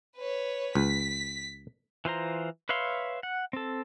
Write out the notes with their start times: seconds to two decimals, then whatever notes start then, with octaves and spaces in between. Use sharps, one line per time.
0.17 B4 C#5
0.75 C#2 B6
2.05 E3 F4 C5 A#5
2.69 B4 C#5 E5 F5 C6
3.23 F#5
3.53 C4 A4